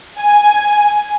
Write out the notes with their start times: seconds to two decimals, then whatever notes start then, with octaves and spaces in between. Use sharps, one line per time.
0.19 G#5